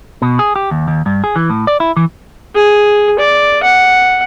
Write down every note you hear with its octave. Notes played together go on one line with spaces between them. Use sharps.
B2
G#4
G4
D#2
D#2
G2
G#4
E3
A2
D5
E4
E3
G#4
D5
F#5